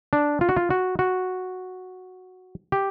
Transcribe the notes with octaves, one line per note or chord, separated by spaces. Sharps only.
D4
F4
F#4
F4
F#4
F#4
G4